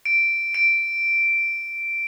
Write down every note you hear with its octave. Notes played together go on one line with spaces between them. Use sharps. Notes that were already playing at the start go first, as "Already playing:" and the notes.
D7
D7